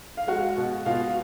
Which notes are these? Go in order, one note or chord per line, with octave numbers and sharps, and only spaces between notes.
F5
G#3 F#4 F#5
B2
B2 F4 F5